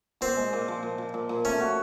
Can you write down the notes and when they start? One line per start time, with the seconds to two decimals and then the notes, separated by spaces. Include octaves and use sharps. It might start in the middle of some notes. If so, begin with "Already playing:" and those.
0.21 A#2 C4
0.37 G#3
0.53 A#2
0.68 F3
0.83 A#2
0.98 F3
1.14 A#2
1.29 A#2
1.45 A3 C#4
1.60 F#4